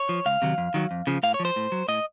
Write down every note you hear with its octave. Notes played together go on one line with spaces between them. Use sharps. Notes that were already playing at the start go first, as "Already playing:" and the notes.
Already playing: C#5
F3
C#2 F5
C3 D#3 F#3
F2
D#3 F#3
F2
C#3 F3
A2 F5
C#5
F3
C5
A2
F#3
A2 D#5